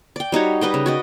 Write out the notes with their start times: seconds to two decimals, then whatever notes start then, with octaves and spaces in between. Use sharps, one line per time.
0.16 D5 G5
0.32 G3 D#4 F#4 C#5
0.61 G3 B4 D#5 G5
0.74 C#3
0.86 F#4 D5 D#5